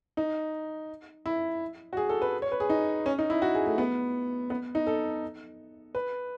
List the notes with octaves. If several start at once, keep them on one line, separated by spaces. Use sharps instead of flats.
D#4
E4
F#4
G#4
A4
B4
C#5
B4
G#4
D#4
C#4
D#4
E4
F#4
G#4
A3
B3
B3
D#4
A4
B4